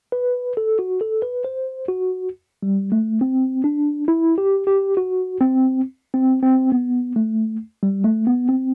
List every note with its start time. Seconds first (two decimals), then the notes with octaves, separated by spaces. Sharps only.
0.12 B4
0.57 A4
0.79 F#4
1.01 A4
1.22 B4
1.44 C5
1.88 F#4
2.63 G3
2.92 A3
3.21 C4
3.64 D4
4.08 E4
4.38 G4
4.67 G4
4.97 F#4
5.41 C4
6.14 C4
6.43 C4
6.72 B3
7.16 A3
7.83 G3
8.04 A3
8.27 B3
8.49 C4